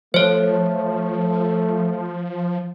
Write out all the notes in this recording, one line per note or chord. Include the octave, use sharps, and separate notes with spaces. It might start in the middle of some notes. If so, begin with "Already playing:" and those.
F3 A3 C5 C#5